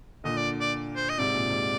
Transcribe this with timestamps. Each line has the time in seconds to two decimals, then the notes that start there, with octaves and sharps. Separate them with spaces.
0.24 A#2 D3 D#5
0.37 D5
0.60 D5
0.96 C5
1.09 D#5
1.18 G#2 C3 D5
1.35 A#2
1.50 G#2 C3